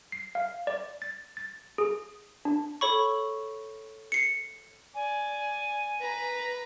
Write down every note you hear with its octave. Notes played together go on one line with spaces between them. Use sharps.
C7
F5
D5
A6
A6
G#4
D4
A4 C#5 B5 C#6
C7 C#7
D5 G#5
B4 A#5